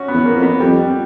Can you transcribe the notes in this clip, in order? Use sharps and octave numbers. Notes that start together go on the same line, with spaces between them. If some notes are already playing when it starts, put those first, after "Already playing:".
Already playing: C#4 F#4
B3
E2
A#3
F2
B3
F2 G3